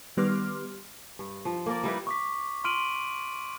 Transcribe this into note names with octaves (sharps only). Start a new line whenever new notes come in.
D#3 G3 B3 C6 D6 F6
G2
F3
A#3 A#4 D5
G3 D#4 E4 B4
C#6 D6 B6
C6 F6 D7 D#7 F#7